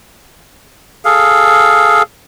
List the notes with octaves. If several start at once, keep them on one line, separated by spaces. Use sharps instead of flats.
G#4 A4 F5